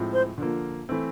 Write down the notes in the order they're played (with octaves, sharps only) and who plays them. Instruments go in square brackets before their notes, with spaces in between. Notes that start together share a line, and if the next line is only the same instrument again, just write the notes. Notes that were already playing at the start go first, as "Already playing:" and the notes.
Already playing: [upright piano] A2 F3 G#3 C4
[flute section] C5 C6
[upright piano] D3 F3 A#3
E3 A3 C4